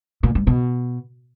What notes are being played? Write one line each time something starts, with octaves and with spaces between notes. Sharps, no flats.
A#2
G2
B2